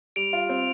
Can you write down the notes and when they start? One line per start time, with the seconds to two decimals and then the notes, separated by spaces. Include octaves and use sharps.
0.16 G3 D7 F7
0.33 F4
0.49 C4